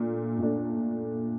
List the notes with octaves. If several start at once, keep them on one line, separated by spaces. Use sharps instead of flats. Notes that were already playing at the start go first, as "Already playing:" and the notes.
Already playing: A#2 A3 D4
A#2 A3 D4